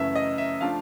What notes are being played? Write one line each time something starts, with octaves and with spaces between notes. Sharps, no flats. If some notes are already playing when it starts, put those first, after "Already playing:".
Already playing: F#2 C#3 E3 A3 E5
D#5
E5
F3 A3 D4 F5